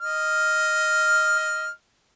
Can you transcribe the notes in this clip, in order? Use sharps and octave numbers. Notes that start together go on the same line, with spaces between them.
D#5 F6